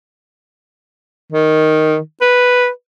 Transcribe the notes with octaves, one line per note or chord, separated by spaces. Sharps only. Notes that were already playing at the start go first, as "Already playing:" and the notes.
D#3
B4